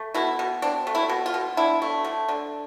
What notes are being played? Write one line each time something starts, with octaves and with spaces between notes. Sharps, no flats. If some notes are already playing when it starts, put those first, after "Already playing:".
Already playing: A3
B2 E4
B2
C4 D4
A3
E4
B2
F4
B2
D4 E4
A3
D3
D3